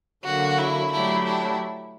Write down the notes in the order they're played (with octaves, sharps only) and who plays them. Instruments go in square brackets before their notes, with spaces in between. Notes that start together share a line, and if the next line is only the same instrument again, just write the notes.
[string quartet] D3 F#3 A#3 [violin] F#4
[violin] E4
[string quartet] F#3 A3 D4 G4 [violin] E4
[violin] E4